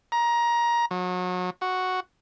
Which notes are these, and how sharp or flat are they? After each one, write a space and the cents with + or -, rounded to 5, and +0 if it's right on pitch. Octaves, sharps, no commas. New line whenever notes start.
A#5 +20
F#3 -30
F#4 +0